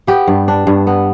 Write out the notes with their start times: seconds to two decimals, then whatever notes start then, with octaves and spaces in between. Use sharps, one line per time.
0.07 B3 G4
0.27 G2
0.48 D4
0.67 G2
0.87 B3